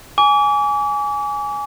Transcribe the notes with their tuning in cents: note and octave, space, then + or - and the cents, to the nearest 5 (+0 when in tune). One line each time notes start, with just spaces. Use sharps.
G#5 +0 D6 -40